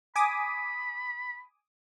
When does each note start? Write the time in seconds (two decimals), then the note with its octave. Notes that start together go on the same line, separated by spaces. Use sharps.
0.16 G#5 B5 D6 D#6